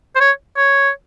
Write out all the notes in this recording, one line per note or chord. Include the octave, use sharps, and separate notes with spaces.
C5
C#5
C#5